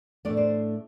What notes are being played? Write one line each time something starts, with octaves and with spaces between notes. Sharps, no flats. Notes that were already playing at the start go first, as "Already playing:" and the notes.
A2 A3 D4 D5
C5